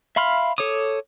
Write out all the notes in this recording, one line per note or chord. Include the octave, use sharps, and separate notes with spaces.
E5 F5 B5 C6 F6
A4 C#5 D6 D#6